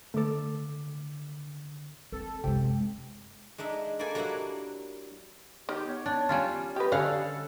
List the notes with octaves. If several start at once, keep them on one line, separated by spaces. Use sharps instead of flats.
D3 A3 A4 D6
C4 A4
F#2 C3 G#3 G5
G#3 D4 D#4 E5
A#3 E4 A4 D5 G#5
F#3 G3 A#3 D4 E4 F#5
D#3 G4
B3 C#5
D4
G3 C#4 F4
G4 B4 D#5
D3 G3 C#4 A4 F5 F#5